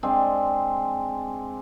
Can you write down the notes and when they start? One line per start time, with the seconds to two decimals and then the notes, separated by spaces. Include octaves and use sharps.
0.03 G#3 C4 D4 F5